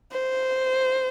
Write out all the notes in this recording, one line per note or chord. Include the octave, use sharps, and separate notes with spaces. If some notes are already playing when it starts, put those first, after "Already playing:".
C5